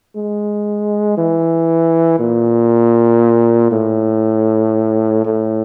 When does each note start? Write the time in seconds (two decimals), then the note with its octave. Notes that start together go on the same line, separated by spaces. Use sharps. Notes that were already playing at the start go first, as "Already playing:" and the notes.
0.16 G#3
1.17 E3
2.19 A#2
3.71 A2
5.25 A2